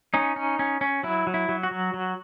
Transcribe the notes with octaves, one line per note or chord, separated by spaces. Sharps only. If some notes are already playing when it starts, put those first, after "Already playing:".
C#4 D#4
C#4
C#4
C#4
F#3 E4
F#3
E4
F#3
F#4
F#3
F#3